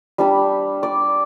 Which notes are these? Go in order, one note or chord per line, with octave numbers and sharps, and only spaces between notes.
G3 D4 B5
D5